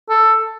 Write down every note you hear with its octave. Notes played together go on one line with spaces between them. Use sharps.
A4